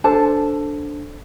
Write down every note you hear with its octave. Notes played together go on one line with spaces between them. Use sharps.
D4 A4 C5 A5